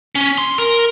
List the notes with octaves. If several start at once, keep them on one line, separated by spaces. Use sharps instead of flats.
C#4
C6
A#4